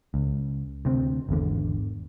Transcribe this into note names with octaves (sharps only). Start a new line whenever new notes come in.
C#2
D2 C3 C4
G#1 E2 D3